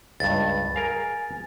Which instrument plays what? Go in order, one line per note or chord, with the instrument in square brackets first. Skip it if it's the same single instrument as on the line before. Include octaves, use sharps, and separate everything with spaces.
[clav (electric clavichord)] C#2 G2 [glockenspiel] A6
[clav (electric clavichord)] G#4 A#4 F5 [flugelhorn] G#5